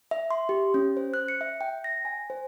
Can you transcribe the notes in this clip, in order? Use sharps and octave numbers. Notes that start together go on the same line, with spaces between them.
E5
C6
G4
C#4
C5
F#6
C#7
E5
G5
A#6
G#5
C5